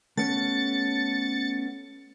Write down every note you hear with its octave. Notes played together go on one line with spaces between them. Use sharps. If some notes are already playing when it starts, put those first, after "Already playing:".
A3 B3 C#4 A6 C#7